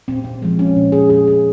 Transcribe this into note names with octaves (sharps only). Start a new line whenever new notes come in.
A#2 C4
C4
F3 G#3 C4
C#4
A#2
G#4
F3 G#3 G#4
G#4